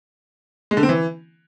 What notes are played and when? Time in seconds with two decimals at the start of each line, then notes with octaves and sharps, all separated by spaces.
0.71 G#3
0.77 D3
0.83 C4
0.89 E3